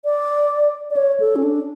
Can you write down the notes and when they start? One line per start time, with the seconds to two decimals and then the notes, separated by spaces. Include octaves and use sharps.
0.05 D5
0.90 D5
0.97 C#5
1.20 A4
1.36 C#4
1.44 D4